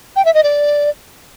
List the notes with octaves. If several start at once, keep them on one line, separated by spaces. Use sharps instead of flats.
G5
E5
D#5
D5